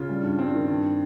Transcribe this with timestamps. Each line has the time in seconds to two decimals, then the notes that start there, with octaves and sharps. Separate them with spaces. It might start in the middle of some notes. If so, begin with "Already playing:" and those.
Already playing: C#3 F4
0.09 G3
0.23 G2
0.39 G2 C4
0.54 D#3
0.68 G2